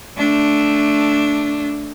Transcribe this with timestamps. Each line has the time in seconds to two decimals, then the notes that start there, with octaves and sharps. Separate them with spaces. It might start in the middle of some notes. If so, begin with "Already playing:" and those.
0.18 A3 D4